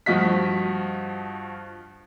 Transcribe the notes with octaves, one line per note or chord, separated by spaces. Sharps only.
G2 F3 F#4 D#5 B6